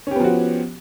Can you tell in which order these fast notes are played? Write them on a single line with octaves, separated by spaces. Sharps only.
C#4 G4 B3 F3 F#4